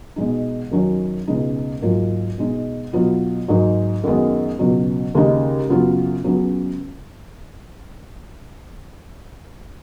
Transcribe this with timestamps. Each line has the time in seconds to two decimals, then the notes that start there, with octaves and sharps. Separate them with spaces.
0.16 B2 G#3 D#4
0.71 F#2 D#3 F#3 C#4
1.27 C#2 B2 G#3 D#4
1.82 G#2 F#3 A#3 F4
2.38 B2 G#3 D#4
2.93 B2 F#3 B3 F4
3.48 G#2 F#3 A#3 D#4
4.04 F#2 D#3 G#3 B3
4.59 C#2 B2 F#3
5.15 D#2 C#3 G#3 D#4
5.69 F#2 C#3 F#3 B3 F4
6.24 C#2 C#3 F#3 B3